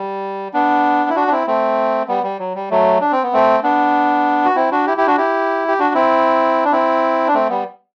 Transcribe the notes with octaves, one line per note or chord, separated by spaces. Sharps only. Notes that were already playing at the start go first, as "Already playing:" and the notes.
Already playing: G3
B3 D4
E4
D4 F#4
D4
C4 E4
A3 C4
G3 B3
G3
F#3
G3
F#3 A3
D4
C4
B3
A3 C4
B3 D4
F#4
C4 E4
D4 F#4
E4 G4
E4 G4
D4 F#4
E4 G4
G4
D4 F#4
C4 E4
D4
C4 E4
D4
A3 C4
G3 B3